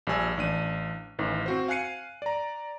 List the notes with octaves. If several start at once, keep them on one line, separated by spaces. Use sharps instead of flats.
A#1 G3 G#5 E6
A1 D4 D#7
A1 D#3 E3
C4 F#4 C5
F5 G#5 F#6 C7 C#7 D#7
D5 A#5